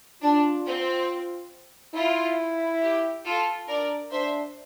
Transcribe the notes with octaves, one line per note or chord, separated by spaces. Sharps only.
D4 F4
C4
E4 F4
G4
F4 A4
D4 A#4 D5
D4 C5 E5